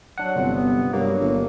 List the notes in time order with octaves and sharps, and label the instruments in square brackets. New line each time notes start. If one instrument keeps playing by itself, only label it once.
[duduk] F#3 [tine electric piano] D4 F#5
[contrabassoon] G1 [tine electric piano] C3
[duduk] B3
[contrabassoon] G2 [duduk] F#3 [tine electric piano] A#3
[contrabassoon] G1